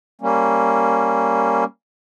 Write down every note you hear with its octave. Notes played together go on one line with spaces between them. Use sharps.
G3 A#3 C#4